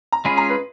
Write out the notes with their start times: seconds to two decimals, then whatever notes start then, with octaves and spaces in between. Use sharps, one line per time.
0.12 A#5
0.25 G#3 C#4 F4 G#4 B5
0.38 A#5
0.50 B4